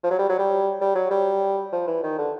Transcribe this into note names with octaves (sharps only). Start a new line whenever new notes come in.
F3
F#3
G3
F#3
G3
G3
F#3
G3
F3
E3
D#3
D3